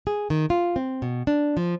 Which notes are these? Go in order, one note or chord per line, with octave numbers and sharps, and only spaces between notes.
G#4
D#3
F4
C4
B2
D4
F3